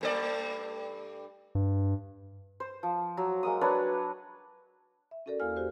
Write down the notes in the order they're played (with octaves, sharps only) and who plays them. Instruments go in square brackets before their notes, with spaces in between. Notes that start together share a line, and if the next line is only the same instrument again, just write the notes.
[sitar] G2 A3 D5
[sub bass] G2
[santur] C5
F3
F#3
G#3 A#3 D#6
F#3 D4 B4 C#5
[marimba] E5
C#4 F#4 A4 A#4 D5
E2 A#3 E4 F5 G#5 F6
F#4 G4 C5